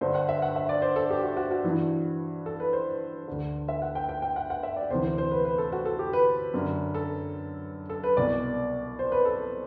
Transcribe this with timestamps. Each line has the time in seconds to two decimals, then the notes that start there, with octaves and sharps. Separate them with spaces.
0.01 G2 D3 C5
0.15 F#5
0.29 E5
0.42 F#5
0.56 E5
0.69 D5
0.82 C5
0.96 A4
1.10 G4
1.23 F#4
1.37 F#4
1.51 F#4
1.64 G2 E3
2.46 A4
2.60 B4
2.73 C5
3.28 D2 D3
3.68 E5
3.82 F#5
3.95 G5
4.09 G5
4.22 G5
4.36 F#5
4.50 F#5
4.63 E5
4.77 D5
4.90 D2 C3 E3 C5
5.04 C5
5.18 C5
5.31 B4
5.45 B4
5.58 A4
5.72 F#4
5.86 A4
5.99 G4
6.13 B4
6.54 F#2 D3
6.95 A4
7.90 A4
8.04 B4
8.17 C2 B2 D5
8.99 C5
9.12 B4
9.25 A4